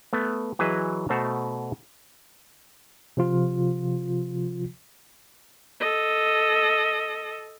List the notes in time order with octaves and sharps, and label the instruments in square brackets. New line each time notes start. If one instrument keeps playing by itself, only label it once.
[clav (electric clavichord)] A3 B3
E3 F#3 G#4 B4 D#5 E5
B2 A3 C5 F#5 A5 A#5
[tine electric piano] C3 F3 F4
[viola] A4 D#5